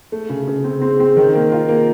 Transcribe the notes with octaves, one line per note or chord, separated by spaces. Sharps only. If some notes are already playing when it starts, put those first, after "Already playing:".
A3
C#3
C#3
C4
C4
C4
D#3
A#3
F4
A#3